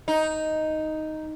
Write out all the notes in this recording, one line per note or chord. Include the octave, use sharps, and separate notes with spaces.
D#4